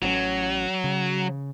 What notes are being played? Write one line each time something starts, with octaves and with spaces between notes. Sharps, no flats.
A1 F#3 C4 C#4
C#3